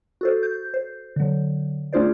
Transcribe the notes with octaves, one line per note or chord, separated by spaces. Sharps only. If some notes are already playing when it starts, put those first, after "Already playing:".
F#4 A4 C5
G6
C5
D3 F#3
A3 D4 F4 G#4 C5 D5